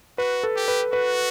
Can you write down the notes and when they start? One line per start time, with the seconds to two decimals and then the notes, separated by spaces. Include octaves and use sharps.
0.18 F#4 B4
0.43 A4
0.56 G4
0.68 B4
0.92 F#4 B4